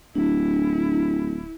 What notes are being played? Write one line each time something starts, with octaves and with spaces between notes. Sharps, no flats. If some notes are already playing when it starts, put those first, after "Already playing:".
D1 D4 E4